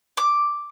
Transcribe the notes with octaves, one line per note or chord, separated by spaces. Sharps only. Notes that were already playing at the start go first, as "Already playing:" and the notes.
D6